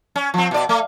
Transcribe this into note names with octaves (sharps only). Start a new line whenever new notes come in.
C#4
F3 C4
B2 D5
A3